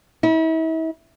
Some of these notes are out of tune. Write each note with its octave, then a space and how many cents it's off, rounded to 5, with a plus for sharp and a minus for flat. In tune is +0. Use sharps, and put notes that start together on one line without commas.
E4 -40